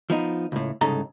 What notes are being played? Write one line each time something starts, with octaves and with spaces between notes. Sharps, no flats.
F3 B3 D#4
C#2 A2
C2 G#2 C#3 D#4 A4 A#5